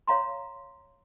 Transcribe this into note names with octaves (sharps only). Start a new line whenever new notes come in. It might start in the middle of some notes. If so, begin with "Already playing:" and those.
C#5 F5 A#5 C6